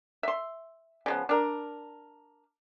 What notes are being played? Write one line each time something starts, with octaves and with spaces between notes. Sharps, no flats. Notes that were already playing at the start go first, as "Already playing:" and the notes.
E5 C6
C#3 F3 B3
D4 A#4